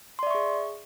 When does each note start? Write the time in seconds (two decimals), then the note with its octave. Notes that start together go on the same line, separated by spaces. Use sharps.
0.19 C6
0.23 D5
0.27 E5
0.31 C#6
0.35 G#4